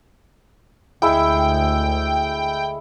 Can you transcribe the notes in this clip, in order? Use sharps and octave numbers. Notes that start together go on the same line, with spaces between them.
D2 G#3 E4 G5 E6